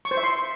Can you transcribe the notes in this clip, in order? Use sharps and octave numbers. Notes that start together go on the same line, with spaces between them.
C#6
C5
E5
C6